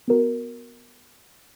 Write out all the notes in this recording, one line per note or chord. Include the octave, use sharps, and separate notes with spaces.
B3 F#4 A#4